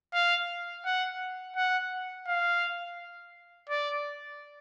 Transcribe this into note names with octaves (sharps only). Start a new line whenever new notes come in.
F5
F#5
F#5
F5
D5